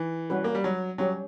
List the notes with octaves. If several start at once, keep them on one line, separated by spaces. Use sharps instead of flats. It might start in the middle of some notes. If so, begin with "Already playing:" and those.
Already playing: E3
G3 C#4 F#4 B4
A#3
G3
F#3
F#3 G3 C#4 G4 C#5